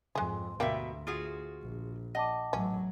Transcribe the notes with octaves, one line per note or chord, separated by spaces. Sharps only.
F2 G#2 G#3 G#4 C6
D2 B2 A#3 G4 E5
F4 F#4 G#4
A#1
D#5 F#5 A5 D6
A1 F#3 C#4